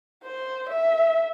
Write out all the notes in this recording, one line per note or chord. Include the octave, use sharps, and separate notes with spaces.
C5
E5